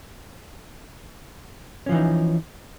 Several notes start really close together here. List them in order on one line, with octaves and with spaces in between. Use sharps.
C#4 F3 E3 D#4